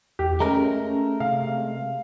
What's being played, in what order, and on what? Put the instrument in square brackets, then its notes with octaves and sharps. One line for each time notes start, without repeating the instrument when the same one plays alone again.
[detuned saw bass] E2 [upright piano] G4
[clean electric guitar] G#3 A3 A#4 [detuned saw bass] C#4 [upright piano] A#5
[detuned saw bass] C3 [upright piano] F5